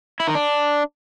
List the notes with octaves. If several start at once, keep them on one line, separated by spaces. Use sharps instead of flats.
E4
D#3
D4